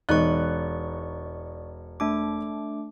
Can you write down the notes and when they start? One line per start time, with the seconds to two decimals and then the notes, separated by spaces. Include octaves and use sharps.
0.09 E1 D#4 D5 C#6 F#6
2.00 A3 D4 D6